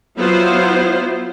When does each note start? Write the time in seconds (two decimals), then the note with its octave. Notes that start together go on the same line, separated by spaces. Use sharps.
0.17 F#3 B3 E4 F4 C5